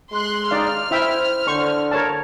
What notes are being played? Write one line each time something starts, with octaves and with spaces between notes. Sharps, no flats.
G#3 C6 F#6
D#4 D5 F5 F6
E4 C5 E5 G5
D3 C5 C#6
A#4 C#5 A5